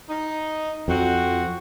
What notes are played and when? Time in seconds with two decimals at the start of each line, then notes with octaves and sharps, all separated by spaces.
0.10 D#4
0.88 F2 C4 F#4